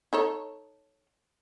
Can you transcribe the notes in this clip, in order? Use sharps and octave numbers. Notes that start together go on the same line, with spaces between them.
D#4 A4 C#5